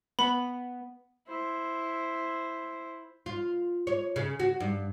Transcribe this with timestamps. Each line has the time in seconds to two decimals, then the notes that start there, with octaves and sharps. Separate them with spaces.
0.19 B3 B5
1.28 E4 C5
3.26 F4
3.87 C#5
4.16 C#3
4.39 F#4
4.60 G2